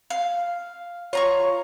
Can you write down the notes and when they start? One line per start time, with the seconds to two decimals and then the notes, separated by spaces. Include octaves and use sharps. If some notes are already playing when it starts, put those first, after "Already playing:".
0.10 F5
1.13 F4 C#5 A#5 C#6